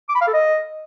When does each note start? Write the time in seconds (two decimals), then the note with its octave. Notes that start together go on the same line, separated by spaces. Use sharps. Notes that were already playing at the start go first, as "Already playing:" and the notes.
0.09 D6
0.15 B5
0.21 F5
0.27 A4
0.33 D#5